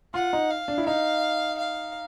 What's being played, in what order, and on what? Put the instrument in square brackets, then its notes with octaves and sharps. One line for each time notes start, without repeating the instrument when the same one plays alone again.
[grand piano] F4 [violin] F#5
[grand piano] D#4
[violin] F5
[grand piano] D4
E4
[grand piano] D#4 [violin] F5
[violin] F5